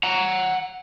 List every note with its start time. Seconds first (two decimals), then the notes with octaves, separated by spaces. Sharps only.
0.03 F#5 A#5